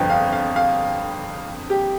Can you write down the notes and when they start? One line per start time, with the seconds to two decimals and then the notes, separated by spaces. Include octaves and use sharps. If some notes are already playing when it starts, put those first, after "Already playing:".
Already playing: G1 F2 D3 F3 B4 G5
0.10 F5
0.33 F5
0.56 F5
1.70 G4